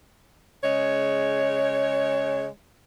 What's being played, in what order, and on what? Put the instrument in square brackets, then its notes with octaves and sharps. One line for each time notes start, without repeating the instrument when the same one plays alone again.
[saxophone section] C#3 G#3 C#5